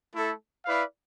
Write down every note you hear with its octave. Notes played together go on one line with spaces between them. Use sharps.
A3 E4 A4
E4 B4 D5 F5